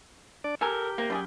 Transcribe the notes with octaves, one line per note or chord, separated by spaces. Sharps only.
D4 D5
G4 A4 A#4 G#5
C3 A#3
F#2 G3 A3 G#4